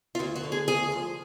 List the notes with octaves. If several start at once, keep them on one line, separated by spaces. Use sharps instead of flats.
F4
D2 F#4
F#4
D3
G#4
D2 G#4
F3